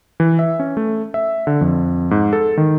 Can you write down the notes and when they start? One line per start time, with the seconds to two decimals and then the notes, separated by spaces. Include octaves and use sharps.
0.20 E3
0.39 E5
0.60 C#4
0.77 A3
1.14 E5
1.47 D3
1.61 F2
2.11 G#2
2.33 A4
2.58 D#3